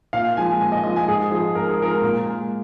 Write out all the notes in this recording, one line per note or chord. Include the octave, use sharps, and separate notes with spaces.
A#2 F5
F3 G#3 G#5
A#2 G#5
D#5
F3 G#3 D#5
G#5
G#2 G#4
F3 G#3 G#4
G#2 A#4
G#4
F3 G#3 A#4
A#2
G#3